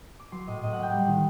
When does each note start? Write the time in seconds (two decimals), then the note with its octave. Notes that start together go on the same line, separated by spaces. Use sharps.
0.19 D6
0.32 F#3 C6
0.47 A2 D#5
0.63 A2 D#5
0.73 A#3 F#5
0.82 G5
0.93 G3
1.07 D#3